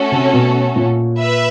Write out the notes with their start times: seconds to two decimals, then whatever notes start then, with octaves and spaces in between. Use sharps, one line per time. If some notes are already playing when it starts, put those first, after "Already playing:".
Already playing: A3 C#4 F#4 A4
0.12 C3
0.33 B2
0.76 A#2
1.18 B4 E5